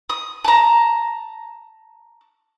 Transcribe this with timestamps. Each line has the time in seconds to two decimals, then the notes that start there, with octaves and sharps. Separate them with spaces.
0.10 D#6
0.44 A5 A#5